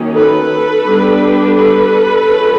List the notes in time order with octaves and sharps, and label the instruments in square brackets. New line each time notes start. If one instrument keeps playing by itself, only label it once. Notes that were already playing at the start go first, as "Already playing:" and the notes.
Already playing: [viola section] D#3 F#3 A#3 C#4
A4 B4
G3 B3 D4
A4 B4
F3 G#3 C#4